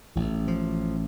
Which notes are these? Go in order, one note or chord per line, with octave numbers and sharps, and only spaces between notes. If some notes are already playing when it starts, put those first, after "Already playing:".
A1 A2 E3
F3